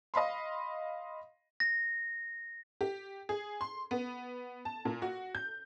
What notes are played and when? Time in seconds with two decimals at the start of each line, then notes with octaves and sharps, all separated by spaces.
0.14 D#5 F5 B5 C6
1.60 A#6
2.81 G4
3.29 G#4
3.61 C6
3.91 B3
4.65 A5
4.85 A#2
5.02 F#4
5.35 G6